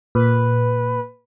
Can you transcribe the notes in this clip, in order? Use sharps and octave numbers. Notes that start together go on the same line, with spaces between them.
A#2 B4